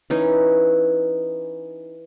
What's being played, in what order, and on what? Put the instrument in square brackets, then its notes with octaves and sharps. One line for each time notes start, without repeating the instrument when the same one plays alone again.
[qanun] E3 C#4 D#4